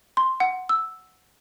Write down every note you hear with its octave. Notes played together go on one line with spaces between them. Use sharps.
C6
F#5
E6